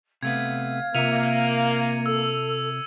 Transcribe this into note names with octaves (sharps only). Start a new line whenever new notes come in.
C3 A3 B3 F5 G#6
C3 A#3 F4 E5 C#7 D#7 F7
A4 E6